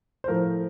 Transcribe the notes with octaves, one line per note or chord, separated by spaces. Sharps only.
C5
A2 F3 A3 A#4